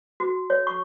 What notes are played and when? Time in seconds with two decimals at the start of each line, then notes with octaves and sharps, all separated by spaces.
0.20 F#4
0.50 C#5
0.67 C#6